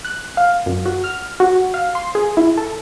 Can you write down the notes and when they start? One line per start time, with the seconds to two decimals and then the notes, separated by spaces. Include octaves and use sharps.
0.05 F#6
0.37 F5
0.66 F#2
0.85 F#4
1.04 F6
1.40 F#4
1.74 F5
1.95 C6
2.15 G#4
2.37 E4
2.58 A4